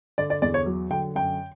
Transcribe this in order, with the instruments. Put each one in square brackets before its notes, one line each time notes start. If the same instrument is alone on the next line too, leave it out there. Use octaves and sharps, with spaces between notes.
[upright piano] D3 D5
D5
E2 D5
C#5
F#3
D3 G5
F#2 G5